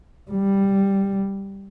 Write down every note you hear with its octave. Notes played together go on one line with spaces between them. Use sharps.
G3